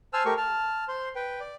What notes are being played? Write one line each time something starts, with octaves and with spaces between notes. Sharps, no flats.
C5 G#5 A5 E6 F6
A3 G4 A#4 C#6
A5 F6
C5 C6
B4 G5
D5